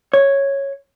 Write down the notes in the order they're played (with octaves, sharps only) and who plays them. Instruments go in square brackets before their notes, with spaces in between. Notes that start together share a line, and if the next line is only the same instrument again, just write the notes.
[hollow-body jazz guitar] C#5